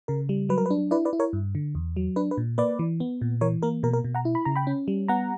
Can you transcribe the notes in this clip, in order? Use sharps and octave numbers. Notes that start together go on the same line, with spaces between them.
C#3 A#4
G3
F#3 B4
A#4
B4
D4
E4 B4 D5
B4 D5
E4
A#4 C#5
G2
D3
E2
F#3
D4 B4
B4
A#2
A#3 B4 D5
E3
B3
A#2
E3 A#4 C#5
A#3 A#4
B2 A#4
A#4
B2
F#5 A#5
E4
B5
C#3 A#5
G5 B5
C#4
G3
B3 F#5 A#5